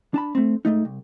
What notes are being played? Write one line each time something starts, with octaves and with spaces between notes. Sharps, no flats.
D4 A5 B5
A3 C4
G#2 B2 A3 D#4
C2